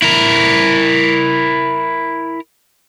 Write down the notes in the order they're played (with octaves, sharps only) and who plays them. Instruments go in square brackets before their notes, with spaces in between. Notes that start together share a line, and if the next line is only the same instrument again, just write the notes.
[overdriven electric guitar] E4 A#4